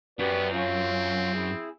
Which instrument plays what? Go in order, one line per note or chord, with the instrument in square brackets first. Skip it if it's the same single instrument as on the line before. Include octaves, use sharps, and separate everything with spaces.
[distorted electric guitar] F#2 [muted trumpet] B3 [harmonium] G4 B4 D5
[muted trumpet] C4 [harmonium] C#4 F4
[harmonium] E4 G#4